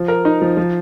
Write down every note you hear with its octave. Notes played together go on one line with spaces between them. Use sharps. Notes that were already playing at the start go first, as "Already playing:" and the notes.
Already playing: F3
A#4
D#4
F3
F3